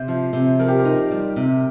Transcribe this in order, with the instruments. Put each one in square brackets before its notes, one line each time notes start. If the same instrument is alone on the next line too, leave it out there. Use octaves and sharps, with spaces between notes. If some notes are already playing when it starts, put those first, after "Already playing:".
Already playing: [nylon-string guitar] C3 [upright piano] C5
[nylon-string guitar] F3
C3
[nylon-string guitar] F3 [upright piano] A#4
[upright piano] G4
A#4
[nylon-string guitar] D#4
G3
C3